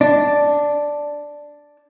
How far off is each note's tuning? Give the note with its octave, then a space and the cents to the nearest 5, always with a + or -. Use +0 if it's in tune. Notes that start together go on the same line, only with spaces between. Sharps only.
D4 +0